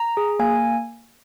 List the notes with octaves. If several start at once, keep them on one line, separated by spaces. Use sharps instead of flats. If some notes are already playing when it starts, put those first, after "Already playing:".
Already playing: A#5
G#4
A#3 G#5